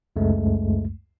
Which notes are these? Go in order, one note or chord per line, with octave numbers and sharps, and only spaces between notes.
C#2 F#2 G#3 A3